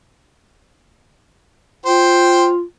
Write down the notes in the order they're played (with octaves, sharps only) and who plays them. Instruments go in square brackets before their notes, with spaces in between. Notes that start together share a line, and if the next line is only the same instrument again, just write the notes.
[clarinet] F4 [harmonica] C5 G5